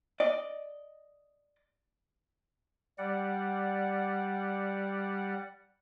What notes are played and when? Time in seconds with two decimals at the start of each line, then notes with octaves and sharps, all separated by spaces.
0.20 D5 D#5
2.98 G3 D5 F#5